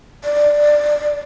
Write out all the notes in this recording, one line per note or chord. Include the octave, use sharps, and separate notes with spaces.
D5